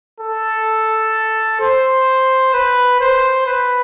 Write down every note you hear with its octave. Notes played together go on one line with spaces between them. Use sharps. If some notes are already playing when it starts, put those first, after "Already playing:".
A4
C5
B4
C5
B4